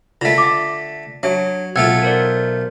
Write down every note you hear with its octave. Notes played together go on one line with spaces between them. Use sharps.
D3 A3 F4 D#5 A#6 B6
E5 D6
F#3 D4 C#5 E5
B1 A3 F4 F#5 E6 G#6
A#4 C5 D5